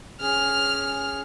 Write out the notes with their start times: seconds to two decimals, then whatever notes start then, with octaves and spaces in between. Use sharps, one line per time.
0.21 C#4 G#4 F6